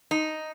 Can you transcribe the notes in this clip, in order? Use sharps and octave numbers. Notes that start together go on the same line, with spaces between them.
D#4